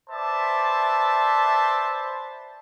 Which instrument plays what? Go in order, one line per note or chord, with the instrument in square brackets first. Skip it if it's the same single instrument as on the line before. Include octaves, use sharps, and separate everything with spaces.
[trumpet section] B4 C5 D5 E5 A5